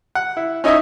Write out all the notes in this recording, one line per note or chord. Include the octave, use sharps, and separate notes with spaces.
F#5
E4
C#4 D#4 E4 C#5 D#5 E5